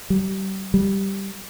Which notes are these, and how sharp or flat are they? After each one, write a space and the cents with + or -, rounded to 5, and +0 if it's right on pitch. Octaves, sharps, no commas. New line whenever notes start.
G3 -30
G3 +0